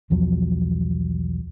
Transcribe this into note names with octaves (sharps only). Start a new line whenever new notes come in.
B1 E2 F3 F#3